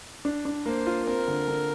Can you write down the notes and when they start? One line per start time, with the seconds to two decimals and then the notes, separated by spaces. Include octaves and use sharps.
0.25 D4
0.45 D4
0.66 A#3 C5
0.87 F4
1.06 C4 A#4
1.28 D3
1.48 D3